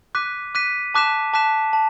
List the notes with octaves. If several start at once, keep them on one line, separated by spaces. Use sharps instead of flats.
D6 F#6 B6 D#7
D6 F#6 B6 D#7
A5 D6 F#6 B6 E7
A5 D6 F#6 B6 E7
A5